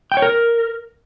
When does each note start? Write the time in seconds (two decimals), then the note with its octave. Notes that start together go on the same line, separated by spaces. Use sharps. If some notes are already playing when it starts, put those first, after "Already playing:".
0.12 G5
0.17 C#5
0.22 A#4